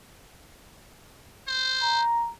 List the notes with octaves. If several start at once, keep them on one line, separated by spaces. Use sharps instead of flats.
C5
A#5